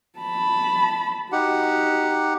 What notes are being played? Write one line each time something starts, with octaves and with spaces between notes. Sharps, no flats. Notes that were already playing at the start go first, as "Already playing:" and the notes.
A5 B5
D#4 F#4 G4 F#5